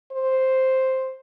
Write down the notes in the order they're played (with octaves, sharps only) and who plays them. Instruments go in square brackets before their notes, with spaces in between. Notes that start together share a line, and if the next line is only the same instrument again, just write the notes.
[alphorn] C5